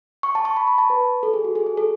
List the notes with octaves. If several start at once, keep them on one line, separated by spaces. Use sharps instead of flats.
C#6
A5
C#6
B5
B5
A5
B4
A4
G#4
F#4
G#4
G#4
A4